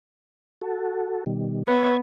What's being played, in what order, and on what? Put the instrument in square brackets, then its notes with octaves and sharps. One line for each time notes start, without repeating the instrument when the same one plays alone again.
[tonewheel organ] F#4 A4
B2 D#3 G3
[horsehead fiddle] B3 [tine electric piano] B4 [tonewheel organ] C#5 E5 G#6